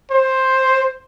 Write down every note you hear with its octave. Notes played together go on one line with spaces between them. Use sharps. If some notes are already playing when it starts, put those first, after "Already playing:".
C5